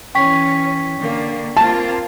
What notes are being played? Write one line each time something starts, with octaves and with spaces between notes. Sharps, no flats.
E3 C#4 G5 C#6 B6
D3 A#3
A#3 C4 F4 A5